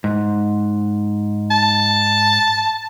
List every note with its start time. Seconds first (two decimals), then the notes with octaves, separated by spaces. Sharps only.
0.04 G#2
1.51 A5